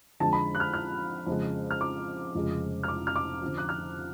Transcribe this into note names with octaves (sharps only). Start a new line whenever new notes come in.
F2 D3 G#3 A5
B5
F#6
F6
F6
F2 C#3 G#3
F6
D6
F1 F2 C#3 F3 G#3
F6
D6
F6
D6
F2 D3 F3
F#6
F6